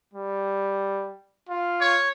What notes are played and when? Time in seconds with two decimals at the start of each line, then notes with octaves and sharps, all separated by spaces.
0.13 G3
1.49 F4
1.81 C#5